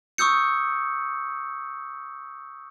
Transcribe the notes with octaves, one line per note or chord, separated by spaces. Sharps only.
C#6 D#6 E6 G6 C#7